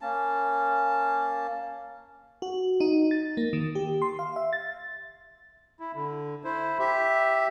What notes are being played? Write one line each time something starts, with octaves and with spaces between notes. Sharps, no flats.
A#3 C#4 A5
F#4
D#4
A6
A#3
D#3
G4
C6
F5
E5
A6
E4
D3
E4 C5
G4 E5